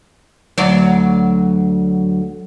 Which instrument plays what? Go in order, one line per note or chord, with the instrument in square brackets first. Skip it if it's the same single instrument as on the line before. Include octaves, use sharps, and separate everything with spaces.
[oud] D2 F#3 D5